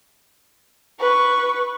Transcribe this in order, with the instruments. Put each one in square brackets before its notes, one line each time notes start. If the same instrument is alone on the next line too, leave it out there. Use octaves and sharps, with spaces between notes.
[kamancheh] B4 C#6